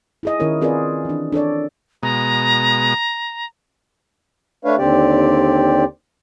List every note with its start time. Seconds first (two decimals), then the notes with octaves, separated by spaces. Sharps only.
0.23 E4 G#4 D#5
0.40 D#3 C#4 E4 A#4 C#5
0.61 C4 F4 G#4 A#4 B4 D5
1.05 E3 D4
1.32 D4 A4 C#5 D5
2.03 B2 G#3 A#5
4.65 A3 D4 B4 C#5 F5
4.78 D#2 D3 C4 G4 D5